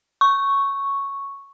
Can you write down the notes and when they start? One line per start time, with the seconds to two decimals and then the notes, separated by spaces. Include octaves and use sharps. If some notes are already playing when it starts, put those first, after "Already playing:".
0.21 C#6